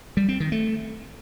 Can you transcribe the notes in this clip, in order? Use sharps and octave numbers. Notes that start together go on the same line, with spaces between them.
G3
C4
D#3
A3